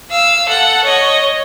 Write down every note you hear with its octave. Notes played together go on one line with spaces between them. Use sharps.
F5 E6
A4 F#5
C#5 D#5